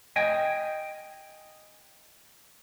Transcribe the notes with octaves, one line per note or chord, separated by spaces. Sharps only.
D#5 G5 G#5